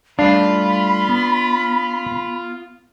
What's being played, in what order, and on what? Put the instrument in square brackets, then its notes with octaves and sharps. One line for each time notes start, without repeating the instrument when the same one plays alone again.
[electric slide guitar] G3 A3 F5 [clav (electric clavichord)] D4 [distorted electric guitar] F4 [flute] B5
[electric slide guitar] B3